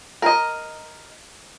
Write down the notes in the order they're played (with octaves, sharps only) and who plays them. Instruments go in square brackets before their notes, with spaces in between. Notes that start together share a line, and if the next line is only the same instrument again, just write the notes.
[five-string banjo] A#4 D#5